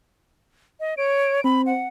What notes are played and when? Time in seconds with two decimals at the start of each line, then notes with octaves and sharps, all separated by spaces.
0.80 D#5
0.97 C#5 D7
1.44 C4 B5
1.66 F#5